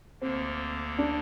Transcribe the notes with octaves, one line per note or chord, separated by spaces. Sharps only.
D2 D3 A#3 C4
D4